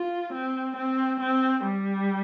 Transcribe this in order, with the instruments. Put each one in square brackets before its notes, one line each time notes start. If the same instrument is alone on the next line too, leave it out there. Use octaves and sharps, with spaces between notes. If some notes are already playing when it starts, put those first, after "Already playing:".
Already playing: [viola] F4
C4
C4
C4
G3